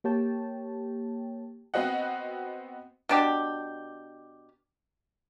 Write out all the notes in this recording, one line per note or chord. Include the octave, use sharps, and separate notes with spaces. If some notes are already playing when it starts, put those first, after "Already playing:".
A#3 G4 C#5 G5 A5
B3 C4 F#4 D#5 F#5
B2 D4 G4